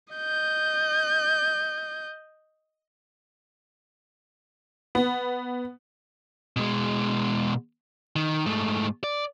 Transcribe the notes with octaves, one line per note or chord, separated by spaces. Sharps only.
D#5 G6
B3
B2 G#3
D#3
G#2 A3
D5